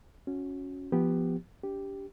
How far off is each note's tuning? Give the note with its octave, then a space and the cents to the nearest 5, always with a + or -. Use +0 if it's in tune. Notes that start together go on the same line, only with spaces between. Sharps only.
C#4 +0 F#4 -20
F3 -10 B3 +0 G4 +0
D4 -40 G4 +0